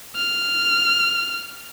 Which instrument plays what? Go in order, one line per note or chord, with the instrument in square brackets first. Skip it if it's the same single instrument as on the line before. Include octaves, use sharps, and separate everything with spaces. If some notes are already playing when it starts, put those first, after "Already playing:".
[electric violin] F6